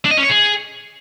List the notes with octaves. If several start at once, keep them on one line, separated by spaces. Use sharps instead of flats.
D4
D#5
C#4
C#5
G#4